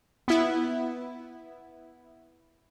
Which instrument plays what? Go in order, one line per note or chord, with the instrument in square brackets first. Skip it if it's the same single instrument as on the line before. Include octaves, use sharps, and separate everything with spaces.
[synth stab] B3 E4